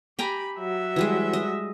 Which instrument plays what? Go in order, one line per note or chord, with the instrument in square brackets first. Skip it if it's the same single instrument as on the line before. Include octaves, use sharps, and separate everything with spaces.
[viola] G4 B5 [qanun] G5 G#5 A#5
[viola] F#3 E5
[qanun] E3 G3 G#3
D#5